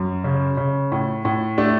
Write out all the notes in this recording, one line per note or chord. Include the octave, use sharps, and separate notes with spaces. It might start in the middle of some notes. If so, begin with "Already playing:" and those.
Already playing: F#2
C#3
C#3
A2
A2
A3 D4